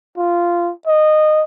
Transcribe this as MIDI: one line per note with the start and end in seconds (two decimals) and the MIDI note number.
0.18 0.71 65
0.87 1.43 75